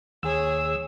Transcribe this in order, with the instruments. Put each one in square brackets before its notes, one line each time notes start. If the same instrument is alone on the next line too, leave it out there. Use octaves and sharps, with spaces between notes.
[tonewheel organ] D#2 E6 [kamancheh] G#4 C#5